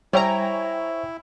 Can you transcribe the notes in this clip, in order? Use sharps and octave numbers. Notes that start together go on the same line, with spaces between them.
G3 E4 C5 C#5 E5 G5 G#5 A#5